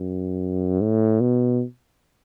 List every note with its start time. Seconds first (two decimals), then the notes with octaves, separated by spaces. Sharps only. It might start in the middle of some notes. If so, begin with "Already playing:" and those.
Already playing: F#2
0.81 A2
1.20 B2